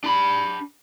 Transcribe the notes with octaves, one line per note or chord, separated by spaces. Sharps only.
D4 B5